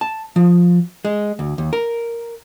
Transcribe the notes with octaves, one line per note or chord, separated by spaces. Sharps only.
A5
F3
G#3
D2
D#2
A#4